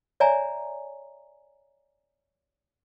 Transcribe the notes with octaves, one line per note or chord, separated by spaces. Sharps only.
C#5 D5 E5 G#5 A#5